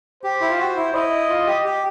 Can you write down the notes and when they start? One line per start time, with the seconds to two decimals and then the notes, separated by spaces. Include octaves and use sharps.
0.23 G4 C5
0.41 E4
0.50 F4
0.59 F#4
0.76 E4
0.94 E4 D#5
1.29 F4
1.47 G4
1.65 G4